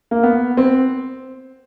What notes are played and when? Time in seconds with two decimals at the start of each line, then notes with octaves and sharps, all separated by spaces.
0.11 A#3
0.23 B3
0.57 C4